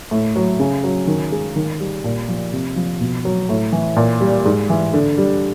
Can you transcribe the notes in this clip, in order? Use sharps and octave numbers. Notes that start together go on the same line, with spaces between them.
A2
F#3
C#3
F#3
D#3
G#3
D#3
G3
A#2
F3
C3
F3
B2
F#3
A2
E3
A#2
G3
G#2
E3
D3
G3